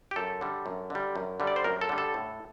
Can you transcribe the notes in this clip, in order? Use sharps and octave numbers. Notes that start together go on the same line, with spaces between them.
G4
F#2 A4
D3 G3
F#2
D3 G3
F#2
D3 G3
D5
C5
F#2 A#4
A4
D3 G3
A4
A2